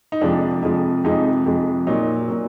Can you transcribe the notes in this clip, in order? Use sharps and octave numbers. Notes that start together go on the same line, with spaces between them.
D#4
F2 C3 F3 G#3 D4
F2 C3 F3 G#3
F2 C3 F3 G#3 D#4
F2 C3 F3 G#3
A#2 F#3 D#4
A#2 F#3